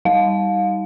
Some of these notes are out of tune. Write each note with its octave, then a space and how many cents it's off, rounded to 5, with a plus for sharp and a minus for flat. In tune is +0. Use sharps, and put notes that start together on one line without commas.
G3 +0 D#4 +25 F5 +30